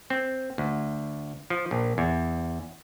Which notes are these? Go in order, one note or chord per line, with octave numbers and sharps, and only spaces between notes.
C4
D2
F3
A#1
E2